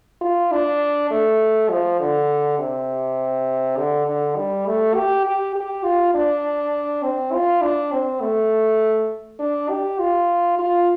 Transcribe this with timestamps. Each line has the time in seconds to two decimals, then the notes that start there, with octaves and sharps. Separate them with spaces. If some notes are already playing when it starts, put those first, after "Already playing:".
0.21 F4
0.52 D4
1.11 A3
1.70 F3
2.00 D3
2.59 C3
3.77 D3
4.07 D3
4.36 G3
4.66 A3
4.95 G4
5.26 G4
5.55 G4
5.84 F4
6.15 D4
7.03 C4
7.33 F4
7.62 D4
7.92 C4
8.21 A3
9.39 D4
9.69 G4
9.99 F4
10.59 F4